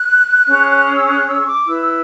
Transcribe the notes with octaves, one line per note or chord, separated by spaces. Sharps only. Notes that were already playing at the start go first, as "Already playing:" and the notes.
Already playing: F#6
C#4 G#4 C#5
E6
F#6
E6
C#6
D6
E4 B4 E6
E6